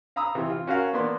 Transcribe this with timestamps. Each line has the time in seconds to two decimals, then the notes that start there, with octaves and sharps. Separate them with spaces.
0.16 F5 A#5 B5 D#6 E6
0.35 C3 E3
0.50 F4
0.67 C#4 F#4 A#4 F5
0.93 A#3 B3 D4 C6